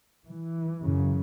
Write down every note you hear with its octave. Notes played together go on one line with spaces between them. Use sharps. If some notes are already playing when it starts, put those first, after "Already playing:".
E3
F#2 C#3